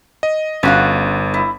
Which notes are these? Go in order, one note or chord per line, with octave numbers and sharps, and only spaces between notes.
D#5
G1 C#4 F#4 F5
E4